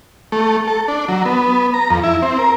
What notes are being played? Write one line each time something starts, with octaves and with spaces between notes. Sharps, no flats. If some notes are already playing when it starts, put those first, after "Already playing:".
A3
A4
D4
F#3
B3
A#5
F2
E4
C4
A#4